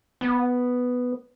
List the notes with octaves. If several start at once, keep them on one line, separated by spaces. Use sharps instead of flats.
B3